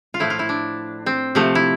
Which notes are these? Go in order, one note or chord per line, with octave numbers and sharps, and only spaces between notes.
F4
A2 F3 A3 E4
F4
E4
D4
C4
C3 F3 A3
E4